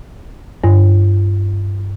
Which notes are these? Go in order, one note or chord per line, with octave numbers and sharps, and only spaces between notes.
G2